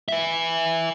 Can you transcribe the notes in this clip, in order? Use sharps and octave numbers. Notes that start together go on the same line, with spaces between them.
B4 E5